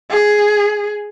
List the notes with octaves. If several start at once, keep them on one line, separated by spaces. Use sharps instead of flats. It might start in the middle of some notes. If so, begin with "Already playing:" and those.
G#4